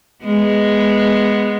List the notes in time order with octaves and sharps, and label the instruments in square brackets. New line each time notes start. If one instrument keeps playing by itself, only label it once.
[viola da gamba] G#3 B3